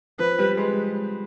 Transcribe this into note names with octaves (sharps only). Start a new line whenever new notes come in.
F3 B4
G3
G#3